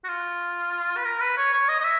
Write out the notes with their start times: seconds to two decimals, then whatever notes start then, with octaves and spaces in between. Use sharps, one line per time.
0.04 F#4
0.08 F4
0.97 B4
1.05 A#4
1.21 B4
1.37 C#5
1.53 C#5
1.69 D#5
1.80 D#5
1.84 E5